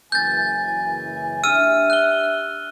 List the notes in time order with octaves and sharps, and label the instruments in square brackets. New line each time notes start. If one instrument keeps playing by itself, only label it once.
[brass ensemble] F#1 E3 G#5 [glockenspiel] G6 A6
[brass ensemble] D4 G4 E5 [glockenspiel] E6 F6 D#7
[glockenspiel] F#6 G7